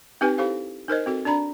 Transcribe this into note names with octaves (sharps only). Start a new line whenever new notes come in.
C4 D#4 G4 B4 G#5
E4 G4 A4 C5 F5
D#4 A#4 C5 D#5
C4 F#4 A4
D4 D5 A#5 B5